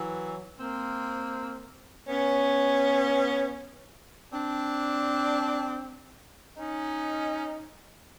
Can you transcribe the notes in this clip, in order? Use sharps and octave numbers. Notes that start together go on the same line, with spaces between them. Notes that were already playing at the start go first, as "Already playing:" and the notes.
Already playing: E3 F#3
A#3 C4
B3 C#4
C4 D4
C#4 D#4